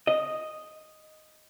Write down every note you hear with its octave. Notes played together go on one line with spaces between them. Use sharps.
D#5